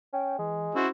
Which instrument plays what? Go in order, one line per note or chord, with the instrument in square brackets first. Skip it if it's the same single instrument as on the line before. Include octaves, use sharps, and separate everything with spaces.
[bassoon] C#4 [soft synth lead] G5
[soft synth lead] E3 [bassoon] G#3
[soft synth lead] C#4 [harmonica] E4 F#4 C5